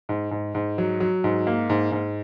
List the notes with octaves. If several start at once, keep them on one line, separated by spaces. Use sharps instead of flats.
G#2
G#2
G#2
F#3
F#3
G#2
A#3
G#2
G#2